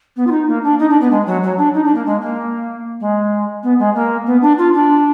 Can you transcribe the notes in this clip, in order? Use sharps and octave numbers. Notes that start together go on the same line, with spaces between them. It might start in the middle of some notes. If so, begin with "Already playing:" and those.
B3
F4
D#4
A#3
D4
D#4
D4
B3
G#3
F#3
F#3
D4
D#4
D4
A#3
G#3
A#3
G#3
B3
G#3
A#3
B3
D4
F4
D4